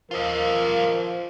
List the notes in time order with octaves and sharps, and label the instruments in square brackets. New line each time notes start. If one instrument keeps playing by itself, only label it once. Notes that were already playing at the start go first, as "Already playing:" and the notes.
[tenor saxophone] F3 [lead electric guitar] F4 D#5 [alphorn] A#4